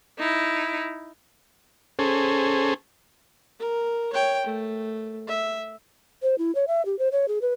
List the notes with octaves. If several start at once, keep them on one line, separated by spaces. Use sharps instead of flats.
D#4 E4
C#4 G#4 A4 C5
A#4
C#5 G5
A3
E5
C5
E4
C#5
E5
G4
C5
C#5
G#4
B4